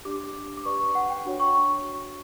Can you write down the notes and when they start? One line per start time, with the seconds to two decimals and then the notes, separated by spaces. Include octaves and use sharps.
0.05 D4 G4 D5 D6
0.57 D6
0.65 G4 B4 D5 C#6
0.95 F#5
1.10 G5
1.25 D4 F#4 C#5
1.40 C#6